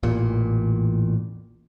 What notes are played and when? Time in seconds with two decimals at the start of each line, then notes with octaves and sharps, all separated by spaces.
0.03 A1 E2 A#2